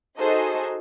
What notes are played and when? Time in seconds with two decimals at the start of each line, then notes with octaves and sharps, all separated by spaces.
0.17 D#4 F#4 G#4 A4 C5 D#5